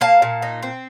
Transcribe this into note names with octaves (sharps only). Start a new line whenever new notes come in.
A#3 F5 A5
A#2
D#4
C4